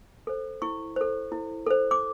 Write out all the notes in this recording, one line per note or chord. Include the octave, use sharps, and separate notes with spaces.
A4 C5
E4 C#6
A4 C5
E4
A4 C5
D6